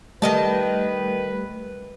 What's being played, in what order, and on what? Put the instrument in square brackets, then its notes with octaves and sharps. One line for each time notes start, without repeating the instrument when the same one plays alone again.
[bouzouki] D#3 D#5 A5 [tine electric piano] G3 A3 G4 [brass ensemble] B4